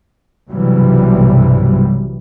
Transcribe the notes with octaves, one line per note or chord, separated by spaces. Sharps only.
B1 G2 C3 E3 F#3 G3